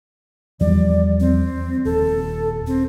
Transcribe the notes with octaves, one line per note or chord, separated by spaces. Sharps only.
E2 F3 G3 D5
C4
D#1 A4
C4